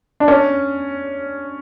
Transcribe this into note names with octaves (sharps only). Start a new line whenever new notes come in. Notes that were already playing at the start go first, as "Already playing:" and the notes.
D4
C#4